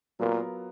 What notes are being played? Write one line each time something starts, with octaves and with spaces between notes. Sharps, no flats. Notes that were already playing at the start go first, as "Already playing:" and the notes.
A#2 F#3 B3 F4 A#4